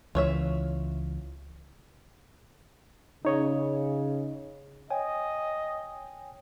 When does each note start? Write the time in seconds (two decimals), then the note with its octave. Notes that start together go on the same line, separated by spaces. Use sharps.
0.15 C#2 E3 F4 C#5 E5
3.25 C#3 D#4 C#5 D#5
4.91 C#5 D#5 G5 G#5